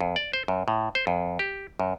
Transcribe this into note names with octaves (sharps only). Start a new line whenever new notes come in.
F2
D5
C5
F#2
A2
C5
F2
G4
F#2